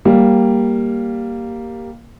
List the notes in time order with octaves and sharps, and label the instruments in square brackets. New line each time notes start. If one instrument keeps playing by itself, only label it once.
[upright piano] G3 A#3